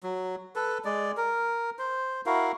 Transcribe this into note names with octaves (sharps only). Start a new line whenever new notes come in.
F#3
A4 B4
G#3 D5
A#4
C5
E4 F#4 A#4 F5